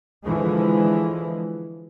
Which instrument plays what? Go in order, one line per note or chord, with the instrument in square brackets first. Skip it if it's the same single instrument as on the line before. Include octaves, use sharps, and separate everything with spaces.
[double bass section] D3 E3 F3 G#3